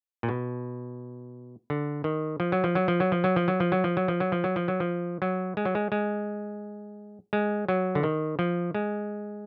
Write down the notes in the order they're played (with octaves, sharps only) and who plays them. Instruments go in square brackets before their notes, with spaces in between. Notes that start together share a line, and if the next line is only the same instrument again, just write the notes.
[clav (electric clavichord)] A#2
B2
D3
D#3
F3
F#3
F3
F#3
F3
F#3
F3
F#3
F3
F#3
F3
F#3
F3
F#3
F3
F#3
F3
F#3
F3
F#3
F3
F#3
G#3
F#3
G#3
G#3
G#3
F#3
D3
D#3
F3
G#3